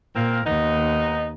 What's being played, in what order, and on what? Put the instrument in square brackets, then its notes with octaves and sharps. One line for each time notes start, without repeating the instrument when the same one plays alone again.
[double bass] A#2 [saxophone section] A#3 C4 A#4
[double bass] D#2 [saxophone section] B3 D#4